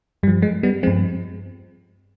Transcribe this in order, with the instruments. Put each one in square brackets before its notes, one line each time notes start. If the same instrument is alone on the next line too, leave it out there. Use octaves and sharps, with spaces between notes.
[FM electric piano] G2 G3
F3
G#3
G3 B3
G2 F3 G#3 C4